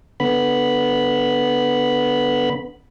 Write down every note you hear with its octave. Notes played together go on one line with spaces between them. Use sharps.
D3 B3 B5